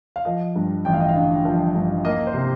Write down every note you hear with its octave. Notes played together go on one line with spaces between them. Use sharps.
F5
F3 D#5
G2
A1 G5
F5
D#5
F5
D3
F3
G2
A#3 D#5
C5
C3